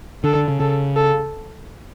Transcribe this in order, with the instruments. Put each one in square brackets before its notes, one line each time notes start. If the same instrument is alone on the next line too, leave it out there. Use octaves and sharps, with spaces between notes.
[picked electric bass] D3 [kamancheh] A4
[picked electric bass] D3
C#3
[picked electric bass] C#3 [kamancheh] A4
[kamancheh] A4